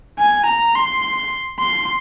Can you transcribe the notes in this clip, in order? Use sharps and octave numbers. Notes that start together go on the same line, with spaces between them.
G#5
A#5
C6
C6